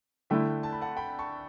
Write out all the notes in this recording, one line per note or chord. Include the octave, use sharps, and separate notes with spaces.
D3 A3 E4 E5 G5
A5
B5
F#5 A5
G5 B5
A5 C#6